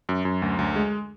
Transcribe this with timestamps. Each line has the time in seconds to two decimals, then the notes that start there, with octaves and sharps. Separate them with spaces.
0.09 F#2
0.25 F#2
0.42 D2
0.59 D2
0.76 G#3